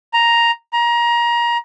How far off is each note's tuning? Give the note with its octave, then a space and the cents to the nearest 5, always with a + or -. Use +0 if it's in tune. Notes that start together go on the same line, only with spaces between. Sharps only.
A#5 +5
A#5 +25